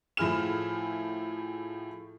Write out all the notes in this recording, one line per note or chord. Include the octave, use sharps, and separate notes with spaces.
A2 F3 E4 G#4 F6 E7